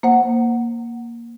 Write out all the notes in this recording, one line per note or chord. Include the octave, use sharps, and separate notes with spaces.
A#3 C5 F#5